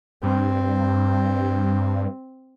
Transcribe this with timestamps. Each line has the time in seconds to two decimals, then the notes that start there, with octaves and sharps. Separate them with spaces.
0.23 G2 C4